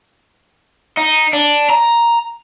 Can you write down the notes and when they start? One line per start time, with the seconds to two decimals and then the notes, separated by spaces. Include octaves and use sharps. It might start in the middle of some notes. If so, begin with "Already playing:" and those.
0.97 D#4
1.33 D4
1.70 A#5